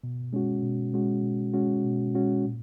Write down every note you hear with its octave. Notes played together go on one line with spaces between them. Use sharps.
B2
G#3 C#4 F#4
B2
G#3 C#4 F#4
B2
G#3 C#4 F#4
B2
G#3 C#4 F#4
A#2